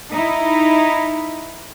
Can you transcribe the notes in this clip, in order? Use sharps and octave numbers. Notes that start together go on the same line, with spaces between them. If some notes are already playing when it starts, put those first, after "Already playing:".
D#4 E4